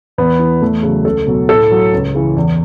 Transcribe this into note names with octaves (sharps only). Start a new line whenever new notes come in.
E2 B3
E3
E2 A3
C#3 F#3
C#2 A4
B2 F#3
A2 A4
F#3
C#2
C#3 E3
E2